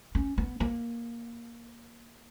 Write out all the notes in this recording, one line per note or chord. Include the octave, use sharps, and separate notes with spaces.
C#4
B3
A#3